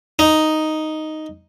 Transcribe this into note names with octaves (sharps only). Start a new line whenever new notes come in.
D#4